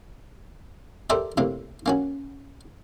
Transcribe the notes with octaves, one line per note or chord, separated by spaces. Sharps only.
G4 A4 A#4 C5 D5 E5
A2 C3 A#3
A#3 C#4 F#4